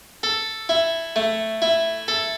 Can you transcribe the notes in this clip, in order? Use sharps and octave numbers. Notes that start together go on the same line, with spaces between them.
A4
E4
A3
E4
A4